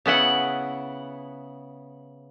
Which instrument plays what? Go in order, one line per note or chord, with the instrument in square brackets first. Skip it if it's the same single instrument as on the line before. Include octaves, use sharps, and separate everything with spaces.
[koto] C#3 B3 E4 F#5